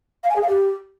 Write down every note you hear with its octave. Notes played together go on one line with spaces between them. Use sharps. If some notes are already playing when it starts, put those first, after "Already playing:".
F5
G#5
G#4
F5
G4